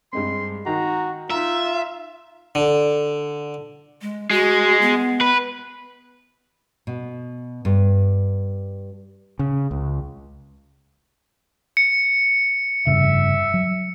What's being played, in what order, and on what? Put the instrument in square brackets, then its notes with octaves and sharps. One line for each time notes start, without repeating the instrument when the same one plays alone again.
[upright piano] G2 G#3 C4 [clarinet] C6
[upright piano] D#3 [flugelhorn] F#4 [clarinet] A#5
[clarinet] D#4 [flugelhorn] F4 [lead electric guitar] E5 [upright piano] A#5
[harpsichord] D3
[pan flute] G#3
[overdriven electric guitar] G#3 [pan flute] F#4
[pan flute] B3
[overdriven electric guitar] B4
[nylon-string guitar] B2
G2
[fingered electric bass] C#3
C#2
[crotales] C#7
[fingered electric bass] F1 G2 C#3 [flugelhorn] E5
[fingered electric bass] F#3